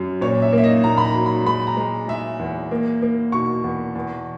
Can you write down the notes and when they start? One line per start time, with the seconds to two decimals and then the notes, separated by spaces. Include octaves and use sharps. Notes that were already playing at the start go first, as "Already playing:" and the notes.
Already playing: F#2
0.21 A#2 C#5
0.42 E5
0.53 A#3
0.58 E5
0.64 D#5
0.84 A#2 A#5
0.98 B5
1.05 A#5
1.15 F#3
1.26 B5
1.46 G#3 B5
1.67 A#5
1.77 G#3
2.08 G#3 E5
2.39 E2
2.71 A#3
3.02 A#3
3.32 B2 C#6
3.64 E2
3.95 E2